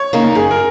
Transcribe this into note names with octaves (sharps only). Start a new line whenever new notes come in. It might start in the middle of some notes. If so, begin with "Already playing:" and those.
Already playing: C#5
C#3 A#3 D#4
F#2 G#4
A#4